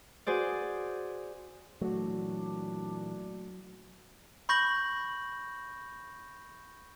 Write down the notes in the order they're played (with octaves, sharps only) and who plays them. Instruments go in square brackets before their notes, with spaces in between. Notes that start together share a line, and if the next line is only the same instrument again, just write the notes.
[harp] F#4 G#4 C5 D5
[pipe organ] A#2 E3 [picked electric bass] F#3 [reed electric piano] A3 F#4 [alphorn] D4
[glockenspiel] B5 C#6 G6 A#6 F#7